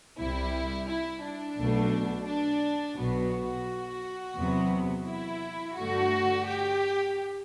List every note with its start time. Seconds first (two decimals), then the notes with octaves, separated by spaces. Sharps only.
0.19 C2 C3 G3 E4
0.88 E4
1.23 D4
1.58 B1 B2 A3
2.27 D4
2.97 B1 B2 F#3 B3 F#4
4.36 E2 C3 F#3 B3
5.06 E4
5.76 G2 D3 A3 F#4
6.45 G4